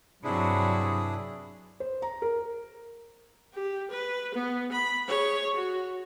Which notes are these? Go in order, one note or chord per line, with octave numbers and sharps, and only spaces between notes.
G2 C3 F#3 D4 E4 G#4
C5
A#5
A#4
G4
B4
B3
B5
G#4 C#5
F#4